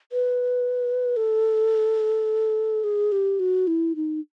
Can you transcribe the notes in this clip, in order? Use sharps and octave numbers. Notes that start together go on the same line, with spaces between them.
B4
A4
G#4
G4
F#4
E4
D#4